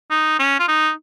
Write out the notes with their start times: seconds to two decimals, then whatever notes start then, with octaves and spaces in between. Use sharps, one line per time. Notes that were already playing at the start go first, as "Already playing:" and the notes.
0.10 D#4
0.39 C#4
0.60 F4
0.68 D#4